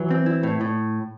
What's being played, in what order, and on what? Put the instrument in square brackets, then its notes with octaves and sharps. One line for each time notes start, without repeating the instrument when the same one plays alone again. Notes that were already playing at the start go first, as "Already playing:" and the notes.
Already playing: [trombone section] E3 [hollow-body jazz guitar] F#3
[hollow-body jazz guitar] C4
E4
A2
A2